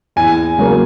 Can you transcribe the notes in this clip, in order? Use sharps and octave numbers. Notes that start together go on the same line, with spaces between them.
E2 G#5
C#3 F#3 A#3